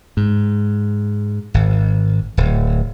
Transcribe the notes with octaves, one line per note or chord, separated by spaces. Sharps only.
G#2
G#1
D1